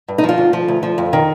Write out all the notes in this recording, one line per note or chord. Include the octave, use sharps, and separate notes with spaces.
G2
D#4
F3
F4
D2
F3
D2
F3
F2
D#3